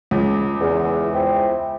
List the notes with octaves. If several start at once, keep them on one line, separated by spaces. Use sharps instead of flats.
C#2
E2
E4 C5 G5